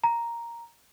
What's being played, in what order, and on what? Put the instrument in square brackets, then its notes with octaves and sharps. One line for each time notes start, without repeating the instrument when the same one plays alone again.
[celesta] A#5